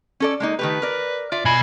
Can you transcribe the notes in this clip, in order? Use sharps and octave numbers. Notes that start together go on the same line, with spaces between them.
C#4 A4 D5
G#3 A#3 D#4
D#3 A3 G4 B4
A#4 D5
F4 D5 E5
B2 G#5 B5